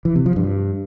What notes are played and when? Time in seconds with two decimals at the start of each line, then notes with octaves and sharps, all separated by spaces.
0.05 E3
0.15 C3
0.26 F3
0.36 G2